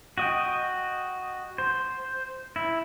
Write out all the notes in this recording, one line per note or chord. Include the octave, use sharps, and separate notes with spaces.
F#4 D#5 G5
C5
E4